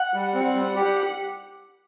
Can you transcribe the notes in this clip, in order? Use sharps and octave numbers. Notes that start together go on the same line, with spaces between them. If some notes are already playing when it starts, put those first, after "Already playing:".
Already playing: F#5
G3
C4
G3
G4